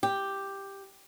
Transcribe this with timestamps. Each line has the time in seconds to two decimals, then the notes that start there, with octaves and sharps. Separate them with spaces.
0.03 G4